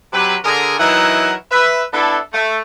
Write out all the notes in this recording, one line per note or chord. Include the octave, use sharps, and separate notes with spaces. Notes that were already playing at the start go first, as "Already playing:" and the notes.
C3 F#3 G4 B4
D3 G#4 A#4
E3 F#3 D#4 E4 A#4 F#5
B4 E5
B3 D4 E4 A4
A3